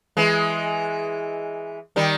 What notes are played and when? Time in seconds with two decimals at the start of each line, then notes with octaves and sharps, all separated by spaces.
0.17 E3 G#3
1.96 D#3 G3